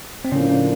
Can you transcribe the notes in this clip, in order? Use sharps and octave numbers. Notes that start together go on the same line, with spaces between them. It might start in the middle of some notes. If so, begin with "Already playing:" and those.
C4
A2 C#3 F3 A#3 C#4 D4
C#4